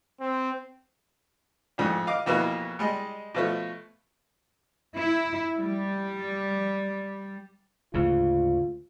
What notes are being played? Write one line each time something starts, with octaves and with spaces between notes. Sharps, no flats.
C4
A1 F2 G#2
D#5 F5 D6
F2 B2 E3 A#3
G3 G#3 D#5
B2 F3 A3
E4
G3
D2 G#2 C#3 F4